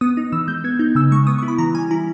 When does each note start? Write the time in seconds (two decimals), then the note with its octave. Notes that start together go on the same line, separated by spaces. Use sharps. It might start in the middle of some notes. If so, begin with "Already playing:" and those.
0.01 B3 D#6
0.17 D#4
0.32 E3 E6
0.48 G#3 G6
0.64 B3 G#6
0.79 D#4 G6
0.95 C#3 E6
1.11 G#3 C#6
1.27 B3 D#6
1.38 C#6
1.43 E4
1.48 B5
1.58 E3 A#5
1.74 G3 G#5
1.91 E4 A#5